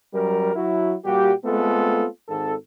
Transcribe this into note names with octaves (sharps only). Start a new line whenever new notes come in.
F#2 F#3 G3 A#4
F#3 E4 F#4
A#2 G3 F#4 G4
G#3 A3 B3 C4 F4 A4
G#1 A4